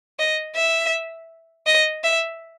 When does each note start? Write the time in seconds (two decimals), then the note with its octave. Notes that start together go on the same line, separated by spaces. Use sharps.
0.19 D#5
0.56 E5
1.67 D#5
2.04 E5